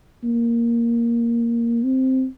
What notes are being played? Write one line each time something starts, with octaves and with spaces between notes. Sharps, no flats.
A#3
C4